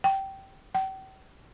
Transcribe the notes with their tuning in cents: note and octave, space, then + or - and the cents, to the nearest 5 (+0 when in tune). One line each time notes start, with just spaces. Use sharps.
G5 -15
G5 -40